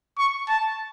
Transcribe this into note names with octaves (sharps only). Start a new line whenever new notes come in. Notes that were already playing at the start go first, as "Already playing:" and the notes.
C#6
A5